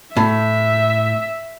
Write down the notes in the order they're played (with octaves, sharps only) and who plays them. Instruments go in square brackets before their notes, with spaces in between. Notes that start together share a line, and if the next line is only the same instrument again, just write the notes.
[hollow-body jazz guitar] A2 [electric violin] E5